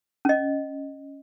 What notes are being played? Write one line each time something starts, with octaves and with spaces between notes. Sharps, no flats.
C#4 D#5